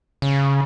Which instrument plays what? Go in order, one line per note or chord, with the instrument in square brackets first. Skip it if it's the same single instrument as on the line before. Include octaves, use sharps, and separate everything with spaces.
[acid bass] C#3